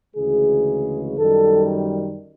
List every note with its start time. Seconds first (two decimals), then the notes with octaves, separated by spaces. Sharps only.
0.16 D2 C#3 E3 G#3 G#4
1.18 F#2 D#3 G3 A4